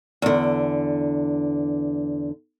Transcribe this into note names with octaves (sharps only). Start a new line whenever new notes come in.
E2 D3